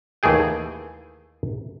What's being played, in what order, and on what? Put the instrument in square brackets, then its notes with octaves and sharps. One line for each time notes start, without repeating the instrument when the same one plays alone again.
[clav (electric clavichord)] D#2 E3 A3 G#4 G5